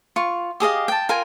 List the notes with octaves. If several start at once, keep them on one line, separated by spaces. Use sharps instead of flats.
F4 C#6
G4 G#4 D#5 F5
G5 A5
F4 A#4 G5 G#5